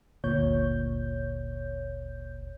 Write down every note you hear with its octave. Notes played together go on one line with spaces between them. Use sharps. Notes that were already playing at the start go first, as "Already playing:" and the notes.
G1 D2 A#2 C#5 G6